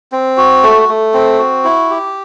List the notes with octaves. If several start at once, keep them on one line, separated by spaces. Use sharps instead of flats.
C4
F#4
A3
A3
C4
F#4
E4
G4